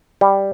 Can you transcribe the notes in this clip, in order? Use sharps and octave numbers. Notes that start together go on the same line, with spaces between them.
G3